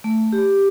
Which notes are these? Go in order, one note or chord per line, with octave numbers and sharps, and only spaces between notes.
A3
G4